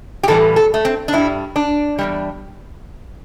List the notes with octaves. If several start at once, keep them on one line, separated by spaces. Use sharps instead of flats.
G4
A2 E3 G3 A4
A4
A3
C4
D4
G2 G3 E4
D4
E2 C3 G3